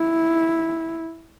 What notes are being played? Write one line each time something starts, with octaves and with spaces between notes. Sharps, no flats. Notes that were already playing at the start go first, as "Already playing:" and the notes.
Already playing: E4